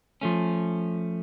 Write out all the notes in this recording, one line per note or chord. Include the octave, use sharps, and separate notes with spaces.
F3 A3 C#4